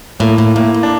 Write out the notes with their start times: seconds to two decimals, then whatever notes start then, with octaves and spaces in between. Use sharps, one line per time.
0.20 A2 A#3
0.38 A2
0.56 A2 A#3
0.74 A2
0.83 D4